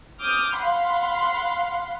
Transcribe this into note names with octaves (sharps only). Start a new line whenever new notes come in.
D6 D#6 F6 G6
F5 F#5 B5 C6